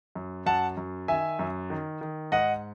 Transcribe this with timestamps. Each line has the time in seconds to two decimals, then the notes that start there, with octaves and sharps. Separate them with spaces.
0.15 F#2
0.46 F#2 F#5 A5
0.77 F#2
1.08 D#3 E5 G#5
1.39 F#2
1.70 D#3
2.01 D#3
2.32 G#2 D#5 F#5